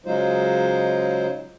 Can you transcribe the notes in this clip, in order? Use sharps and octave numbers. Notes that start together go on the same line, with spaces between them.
C#3 F#3 G#3 D#4 F4 C5